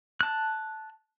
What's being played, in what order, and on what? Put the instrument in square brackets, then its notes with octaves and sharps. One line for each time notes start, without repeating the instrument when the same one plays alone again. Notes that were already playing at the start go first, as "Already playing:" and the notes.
[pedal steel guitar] A5 F#6